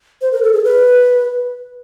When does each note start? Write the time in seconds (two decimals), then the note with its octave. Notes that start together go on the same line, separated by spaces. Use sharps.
0.21 C5
0.32 A#4
0.43 A4
0.53 G#4
0.64 B4